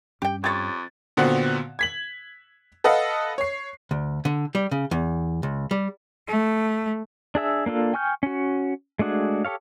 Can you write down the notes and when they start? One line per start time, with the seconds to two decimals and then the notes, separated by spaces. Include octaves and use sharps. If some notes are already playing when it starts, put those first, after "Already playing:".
0.22 G2 G3 C#4 G4 G5
0.44 F2 G4 C#5 G#6 A6
1.17 A#2 D3 B3 C4 F#4
1.79 G#6 B6 F#7
2.84 A4 B4 D#5 F5 F#5
3.38 C#5 C7
3.91 D2
4.25 D3
4.55 G3
4.71 C#3
4.91 E2
5.43 C#2
5.71 G3
6.26 A3
7.35 D4 G#4 E5 E6
7.66 A#3 D4 F4 A4
7.93 G5 G#5 C#6 F6 G6
8.23 C#4 F#4
8.99 G#3 A3 D4 F#4 G#4
9.45 G4 A4 C#5 F5